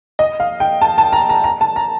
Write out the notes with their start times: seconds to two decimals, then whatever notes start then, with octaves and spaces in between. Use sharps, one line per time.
0.19 D#5
0.40 F5
0.60 G5
0.81 A5
0.98 A5
1.13 A#5
1.29 A#5
1.44 A#5
1.61 A5
1.76 A#5